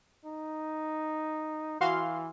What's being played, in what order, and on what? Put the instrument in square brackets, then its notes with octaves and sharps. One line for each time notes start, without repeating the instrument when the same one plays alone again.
[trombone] D#4
[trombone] E3 [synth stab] F#4 F5 C6